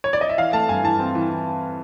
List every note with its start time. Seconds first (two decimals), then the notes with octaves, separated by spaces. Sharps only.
0.04 C#5
0.13 D5
0.21 D#5
0.29 E5
0.38 E3 F5
0.53 A3 A5
0.69 G2 G#5
0.83 E3 A5
0.99 C4
1.15 E3